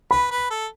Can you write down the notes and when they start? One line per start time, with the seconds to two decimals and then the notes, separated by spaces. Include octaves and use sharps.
0.11 B4 B5
0.31 B4
0.50 A4